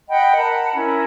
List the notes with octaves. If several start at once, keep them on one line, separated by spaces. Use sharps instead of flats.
D#5 F#5 G5 B5
A#4 F#5 A5 B5
C#4 E4 A#4